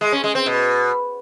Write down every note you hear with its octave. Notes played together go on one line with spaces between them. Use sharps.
G#3
C#4
G#3
C4
B2